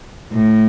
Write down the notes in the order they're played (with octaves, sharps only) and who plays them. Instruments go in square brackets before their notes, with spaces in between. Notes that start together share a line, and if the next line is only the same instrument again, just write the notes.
[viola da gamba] A2